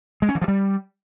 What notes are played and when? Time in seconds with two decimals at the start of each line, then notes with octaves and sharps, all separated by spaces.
0.22 G#3
0.29 C#4
0.35 E3
0.41 F3
0.48 G3